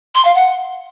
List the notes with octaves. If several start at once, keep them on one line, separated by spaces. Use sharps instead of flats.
C6
F5
F#5